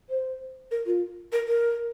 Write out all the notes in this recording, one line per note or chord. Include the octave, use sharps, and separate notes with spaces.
C5
A#4
F4
A#4
A#4